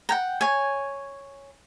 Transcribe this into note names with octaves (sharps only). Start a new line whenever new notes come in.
F#5 G5 A#5
C#5 G#5